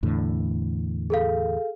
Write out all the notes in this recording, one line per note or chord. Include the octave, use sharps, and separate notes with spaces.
E2 A2 D3
G#4 A4 F5